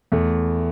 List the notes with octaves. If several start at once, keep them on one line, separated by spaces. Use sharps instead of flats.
E2 A3